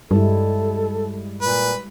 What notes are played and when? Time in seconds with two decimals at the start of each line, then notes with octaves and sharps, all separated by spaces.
0.11 G2 G3 G#3 E4 A4
1.42 A#2 B4